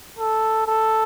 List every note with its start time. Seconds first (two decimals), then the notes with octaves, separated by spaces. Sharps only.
0.19 A4
0.67 A4